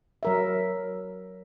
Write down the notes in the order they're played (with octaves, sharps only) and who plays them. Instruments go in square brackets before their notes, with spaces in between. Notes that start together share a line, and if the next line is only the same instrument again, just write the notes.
[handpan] F#3 A#4 E5